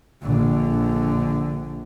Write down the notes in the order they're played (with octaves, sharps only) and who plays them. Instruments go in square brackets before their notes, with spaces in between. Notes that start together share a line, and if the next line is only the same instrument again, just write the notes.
[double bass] A#1 D3